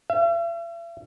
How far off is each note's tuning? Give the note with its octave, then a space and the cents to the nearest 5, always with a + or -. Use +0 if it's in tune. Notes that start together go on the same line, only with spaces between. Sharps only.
E5 +45